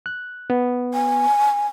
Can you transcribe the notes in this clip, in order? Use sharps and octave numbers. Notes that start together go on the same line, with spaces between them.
F#6
B3
G#5